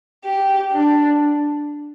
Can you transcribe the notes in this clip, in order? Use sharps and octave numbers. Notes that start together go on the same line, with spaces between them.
G4
D4